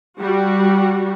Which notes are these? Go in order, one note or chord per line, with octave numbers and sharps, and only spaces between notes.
G3 F#4